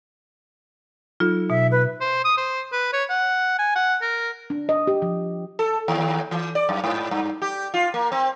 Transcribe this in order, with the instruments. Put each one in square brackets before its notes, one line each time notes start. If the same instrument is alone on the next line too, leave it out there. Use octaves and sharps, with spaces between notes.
[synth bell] F#3 D#4 A4 [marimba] F4
[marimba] B2 [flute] E5
[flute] B4
[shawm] C5
D#6
C5
B4
C#5
F#5
G#5
F#5
A#4
[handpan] D4
D#5
G4
F3
[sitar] A4
D#2
E3
D5
F#2
G#2
G2
G4
F4
A#3
C4